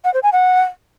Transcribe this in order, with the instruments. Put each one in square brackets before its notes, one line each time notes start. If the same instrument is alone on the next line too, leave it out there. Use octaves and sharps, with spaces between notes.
[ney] F#5
C5
G#5
F#5